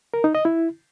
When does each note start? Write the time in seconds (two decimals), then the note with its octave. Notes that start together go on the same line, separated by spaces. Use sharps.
0.14 A#4
0.24 D#4
0.35 D#5
0.45 E4